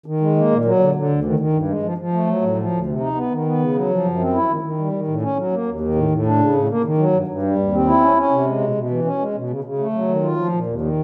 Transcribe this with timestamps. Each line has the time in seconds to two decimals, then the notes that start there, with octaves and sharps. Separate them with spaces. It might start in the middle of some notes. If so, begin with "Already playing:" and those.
0.06 D#3
0.21 G#3
0.36 A#3
0.51 A#2
0.65 F#3
0.79 D3
0.95 D3
1.09 D2
1.25 D#3
1.39 D#3
1.53 G2
1.68 G#3
1.83 F3
1.98 F3
2.13 A3
2.27 F#3
2.41 A2
2.56 F3
2.71 D2
2.86 C3
3.00 D#4
3.15 B3
3.31 D#3
3.45 B3
3.59 C#3
3.75 F#3
3.89 F3
4.04 F#2
4.19 C4
4.33 E4
4.49 D#3
4.62 D#3
4.78 G3
4.92 D#3
5.08 A2
5.22 C#4
5.37 F#3
5.52 A#3
5.67 D#2
5.81 D#3
5.95 A2
6.11 A2
6.25 D4
6.39 C#3
6.55 A2
6.69 A#3
6.84 D#3
6.98 F#3
7.13 G2
7.27 G2
7.42 G3
7.58 D#2
7.72 C4
7.87 E4
8.01 C#4
8.17 C#4
8.31 C3
8.45 G#3
8.61 B2
8.75 B2
8.90 E3
9.05 C#4
9.19 G#3
9.35 B2
9.50 C#3
9.64 C#3
9.79 A3
9.93 F#3
10.08 D#3
10.22 F4
10.37 F3
10.52 A#2
10.66 D#2
10.81 D#3